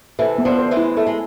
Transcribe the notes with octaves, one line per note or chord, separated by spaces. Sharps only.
C3 E3 A4
B3
D3 F3
C5
E3 G#3
E4
A3 A4
G#3